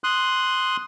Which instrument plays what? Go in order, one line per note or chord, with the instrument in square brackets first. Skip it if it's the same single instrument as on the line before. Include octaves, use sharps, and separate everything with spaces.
[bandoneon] C6 D#6 F#6